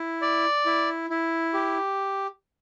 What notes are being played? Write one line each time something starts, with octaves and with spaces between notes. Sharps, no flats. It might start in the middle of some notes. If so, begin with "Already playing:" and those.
Already playing: E4
D5
E4
E4
G4